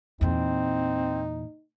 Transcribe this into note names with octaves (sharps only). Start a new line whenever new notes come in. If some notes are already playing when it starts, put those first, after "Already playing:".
E2 A#2 C4 D#4